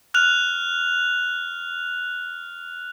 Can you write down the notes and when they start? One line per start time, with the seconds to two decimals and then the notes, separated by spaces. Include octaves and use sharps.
0.14 F6 F#6 F7